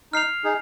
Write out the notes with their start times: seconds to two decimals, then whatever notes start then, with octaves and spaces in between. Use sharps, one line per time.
0.13 D#4 F6 C7 F7
0.44 D#4 G#4